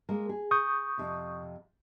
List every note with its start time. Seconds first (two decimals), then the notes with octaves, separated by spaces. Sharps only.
0.09 G#3 A#3 A#4
0.29 G#4
0.51 C#6 D#6 G6
0.98 F2 C3